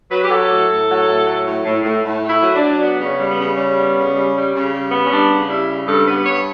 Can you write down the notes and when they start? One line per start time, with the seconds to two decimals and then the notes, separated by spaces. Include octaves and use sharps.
0.10 F#3 B4
0.24 G4
0.30 F#3 A4
0.49 A2
0.68 A2
0.88 F#3
1.07 A2
1.26 F#3
1.45 A2
1.64 A2
1.83 A2
2.03 A2
2.23 A3
2.28 E4
2.41 F#3
2.54 D4
2.60 F#3
2.80 B3 D4
2.99 C#3
3.05 C#4
3.19 G3
3.31 B3
3.38 C#3
3.57 G3 C#4
3.76 B3
3.95 C#3
4.14 G3
4.34 G3
4.53 C#3
4.72 G3
4.91 B3
5.04 C#4
5.10 G3 D4
5.30 C#3
5.49 G3 E4
5.69 C#3
5.88 G2 A4
6.07 B3 B4
6.26 G2 C#5